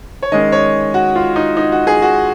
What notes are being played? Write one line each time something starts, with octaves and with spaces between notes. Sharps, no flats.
C#5
D#3 G#3 C#4 D#5
C#5
F#4
F4
D#4
D#4
F#4
G#4
F#4